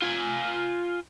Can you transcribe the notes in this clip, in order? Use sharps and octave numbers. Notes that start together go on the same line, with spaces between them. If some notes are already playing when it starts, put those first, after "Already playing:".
F4 G#5